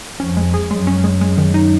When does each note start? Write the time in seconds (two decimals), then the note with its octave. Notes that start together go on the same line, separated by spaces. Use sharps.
0.20 F2 F3 C#4
0.37 G#3
0.54 G#4
0.70 F#2 F#3 G#3
0.87 C#4
1.04 G#3
1.21 G#3
1.38 D#3
1.54 D#4